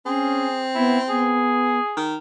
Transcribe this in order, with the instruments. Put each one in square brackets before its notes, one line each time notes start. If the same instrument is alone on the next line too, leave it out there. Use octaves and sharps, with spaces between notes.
[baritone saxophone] C4 [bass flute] C#4 [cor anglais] G#4
[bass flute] B3 [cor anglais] E4
[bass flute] B3 [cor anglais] G#4
[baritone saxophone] D#3